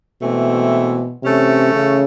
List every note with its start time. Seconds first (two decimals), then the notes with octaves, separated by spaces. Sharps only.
0.22 G#2 B2 E3 A3 C4
1.22 C3 E3 A3 C#4
1.73 C#3